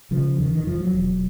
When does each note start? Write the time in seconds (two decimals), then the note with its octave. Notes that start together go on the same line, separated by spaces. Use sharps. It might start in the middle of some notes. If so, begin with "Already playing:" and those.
0.11 C#3 F3
0.38 E2 D#3
0.53 D#3
0.66 E2 F3
0.81 F#3
0.94 E1